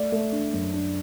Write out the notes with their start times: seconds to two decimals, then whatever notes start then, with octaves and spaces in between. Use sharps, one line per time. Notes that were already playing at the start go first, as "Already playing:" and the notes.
Already playing: A3 D5
0.12 A3
0.32 D4
0.53 F#2
0.73 D4